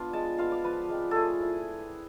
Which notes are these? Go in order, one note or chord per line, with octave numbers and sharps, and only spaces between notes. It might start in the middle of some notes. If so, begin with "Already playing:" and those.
Already playing: B3 D4 F4
G#3 A5
B3 F4 F5
D5
F3 B4
G#3 C4
A3 G#4 A4
E4